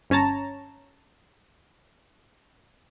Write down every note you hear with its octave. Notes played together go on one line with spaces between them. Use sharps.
G1 C#4 C#5 A5 A#5